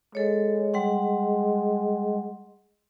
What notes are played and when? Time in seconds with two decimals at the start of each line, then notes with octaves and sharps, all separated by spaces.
0.15 G#3 A4 C#5
0.74 G3 F#5 C6